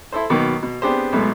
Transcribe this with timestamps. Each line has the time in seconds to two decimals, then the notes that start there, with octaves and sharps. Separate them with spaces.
0.12 E4 A4 C5
0.30 B2 D#3 F#3 A#3 B3
0.62 B2
0.82 B3 C4 D4 G4 G#4 C5
1.12 C#2 G#2 B2 F#3 A3 B3